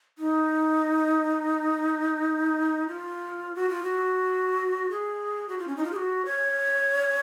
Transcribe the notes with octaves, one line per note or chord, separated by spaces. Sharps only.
D#4
F4
F#4
F4
F#4
G#4
F#4
F4
C#4
D#4
F4
G#4
F#4
C#5